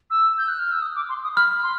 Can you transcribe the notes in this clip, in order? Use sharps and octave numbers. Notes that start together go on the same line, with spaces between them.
E6
G6
F#6
F6
E6
D#6
D6
C6
D#6
B5 F6
C6